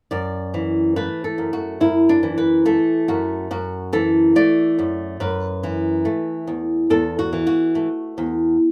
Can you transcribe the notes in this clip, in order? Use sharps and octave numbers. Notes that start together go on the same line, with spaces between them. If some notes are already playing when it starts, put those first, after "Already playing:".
F#2 D5
E3
A3 B4
A4
F#2
F#4
F#2 E4
D4
E3
B4
A3 A4
F#2 F#4
F#2 F#4
E3 A4
A3 D5
F#2
F#2 B4
E3
A3
E2
E2 A4
F#4
E3
F#4
A3
E2